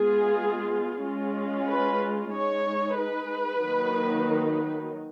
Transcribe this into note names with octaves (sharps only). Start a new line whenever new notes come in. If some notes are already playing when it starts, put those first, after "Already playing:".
Already playing: G#3 B3 F4 G#4
G#3 C#4 F4
B4
G#3 D#4 C#5
B4
D#3 F#3 A#3 D#4